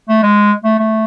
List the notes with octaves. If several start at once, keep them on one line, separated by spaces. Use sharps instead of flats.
A3
G#3
A3
A3